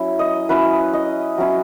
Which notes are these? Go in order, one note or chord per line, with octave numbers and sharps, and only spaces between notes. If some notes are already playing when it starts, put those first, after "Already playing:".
Already playing: F#3 C#4 E4
D#5
F#3 C#4 E4 B4
D#5
F#3 C#4 E4